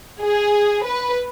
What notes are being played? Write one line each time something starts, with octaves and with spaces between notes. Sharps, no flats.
G#4
B4